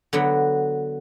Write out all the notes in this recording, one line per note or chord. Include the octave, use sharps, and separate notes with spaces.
D3 F#3 B3